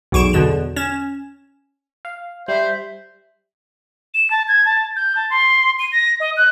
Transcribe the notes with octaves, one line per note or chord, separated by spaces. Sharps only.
B1 E2 C#6 D7 E7
E2 B2 D3 E7
C#4 E7
F5
G3 C5 E5
E7
A5
G#6
A5
G6
A5
C6
D#7
A#6
D#5
F#6